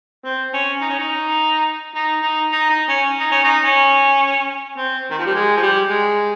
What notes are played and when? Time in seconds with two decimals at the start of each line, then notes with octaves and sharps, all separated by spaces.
0.24 C4
0.53 C#4
0.81 D#4
0.90 C#4
0.99 D#4
1.95 D#4
2.23 D#4
2.52 D#4
2.70 D#4
2.88 C#4
3.19 D#4
3.31 C#4
3.44 D#4
3.64 C#4
4.77 C4
5.11 D#3
5.18 F3
5.26 G3
5.34 G#3
5.57 F3
5.62 G3
5.90 G#3